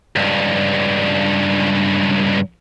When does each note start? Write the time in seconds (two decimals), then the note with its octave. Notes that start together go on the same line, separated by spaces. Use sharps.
0.16 C#2 G2